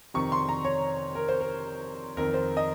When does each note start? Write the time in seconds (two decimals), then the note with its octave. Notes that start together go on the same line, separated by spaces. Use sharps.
0.14 F2 C3 D#3 C#6
0.32 C6
0.49 A#5
0.65 C#5
1.15 A#4
1.28 C5
1.41 A#4
2.17 F2 D#3 A#4
2.34 C5
2.57 D#5